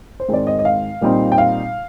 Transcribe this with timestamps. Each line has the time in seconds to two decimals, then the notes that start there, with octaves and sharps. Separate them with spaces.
0.20 C5
0.28 G#2 D#3 G#3 C4 D5
0.47 D#5
0.59 D#5
0.65 F5
1.01 A#2 G3 C4 D#4
1.32 G5
1.38 F5